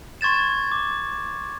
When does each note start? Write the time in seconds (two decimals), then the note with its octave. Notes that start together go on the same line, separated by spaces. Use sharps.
0.21 C6 C#6 G#6 A6 E7
0.72 D6